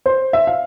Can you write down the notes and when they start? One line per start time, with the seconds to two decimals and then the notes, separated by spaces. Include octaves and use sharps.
0.06 C5
0.33 E5
0.47 F5